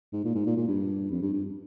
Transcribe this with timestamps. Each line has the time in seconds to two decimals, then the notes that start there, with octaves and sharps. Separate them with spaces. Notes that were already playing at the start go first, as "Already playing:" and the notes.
0.13 G#2
0.24 A#2
0.35 G#2
0.46 A#2
0.57 A#2
0.68 G2
1.11 F2
1.22 G2
1.33 G2